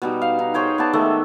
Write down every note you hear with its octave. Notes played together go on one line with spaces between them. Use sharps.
B2 G3 D#4
F5
D#4
G#4 C5 C#5 G5
B3 D5 A5
D#3 G#3 A3 E5